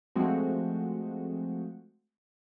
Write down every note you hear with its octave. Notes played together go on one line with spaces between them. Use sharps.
F3 G#3 A3 C4 F#4